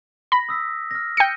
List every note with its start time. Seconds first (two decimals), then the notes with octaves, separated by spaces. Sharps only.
0.32 B5 A#6
0.49 D#6 E6 B6
0.91 F6 A#6
1.17 G5 A#6 C#7 D#7